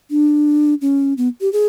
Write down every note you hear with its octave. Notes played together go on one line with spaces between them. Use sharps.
D4
C#4
B3
G4
G#4